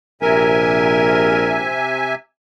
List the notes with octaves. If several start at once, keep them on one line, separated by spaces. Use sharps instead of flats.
A#1 C3 A#4 E5 G#5